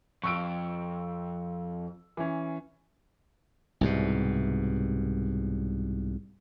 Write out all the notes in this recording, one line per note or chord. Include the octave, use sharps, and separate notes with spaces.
F2 C#6 E6 D7
E3 C#4
C2 G#2 B2